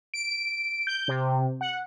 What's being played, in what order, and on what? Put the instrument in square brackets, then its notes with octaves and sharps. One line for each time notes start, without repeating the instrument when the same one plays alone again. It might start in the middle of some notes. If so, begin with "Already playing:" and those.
[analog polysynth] D7
G6
C3
F#5